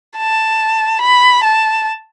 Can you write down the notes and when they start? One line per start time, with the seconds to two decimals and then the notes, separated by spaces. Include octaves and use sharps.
0.17 A5
1.01 B5
1.44 A5